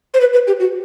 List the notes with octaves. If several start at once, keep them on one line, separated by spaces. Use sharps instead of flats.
C5
B4
B4
G4
F#4